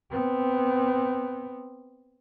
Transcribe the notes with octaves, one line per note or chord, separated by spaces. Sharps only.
B3 C4